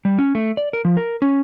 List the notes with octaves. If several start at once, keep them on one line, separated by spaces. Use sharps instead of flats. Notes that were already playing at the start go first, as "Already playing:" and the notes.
G3
C#4
A3
D5
A#4
F3
A#4
C#4